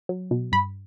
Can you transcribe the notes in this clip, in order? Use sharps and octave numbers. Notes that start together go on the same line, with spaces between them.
F#3
B2
G2 B5